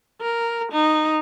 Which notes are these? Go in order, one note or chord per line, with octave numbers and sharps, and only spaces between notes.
A#4
D#4